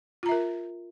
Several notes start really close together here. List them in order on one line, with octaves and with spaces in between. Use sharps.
F4 A#5 E5 A#4